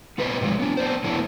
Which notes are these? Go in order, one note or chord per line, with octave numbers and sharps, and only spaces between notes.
B3 D#4 B4 C5 D5 D#5
A2 D3 F3 F#3 G#3
B3 D4
B3 D4 C5
F3 F#3 A3 B3 D4 E4